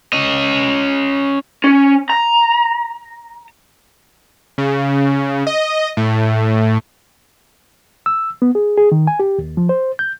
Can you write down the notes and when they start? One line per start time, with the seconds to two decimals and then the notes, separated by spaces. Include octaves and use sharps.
0.13 C#4 D#5
1.64 C#4
2.10 A#5
4.58 C#3
5.47 D#5
5.97 A2
8.06 E6
8.42 B3
8.55 G#4
8.77 G#4
8.92 D#3
9.07 G#5
9.20 G4
9.39 D#2
9.57 F3
9.69 C5
9.99 G6